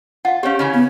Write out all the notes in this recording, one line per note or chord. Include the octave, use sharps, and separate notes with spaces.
F4 F5 F#5
C4 C#4 G4 C#5 F5
C#3 E3 C#4
B3